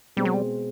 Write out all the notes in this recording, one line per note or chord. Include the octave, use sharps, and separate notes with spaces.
B2 G3 G#3 C4
F#3
G3